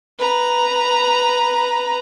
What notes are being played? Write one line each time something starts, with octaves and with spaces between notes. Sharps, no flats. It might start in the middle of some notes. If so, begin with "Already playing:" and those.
B4 A#5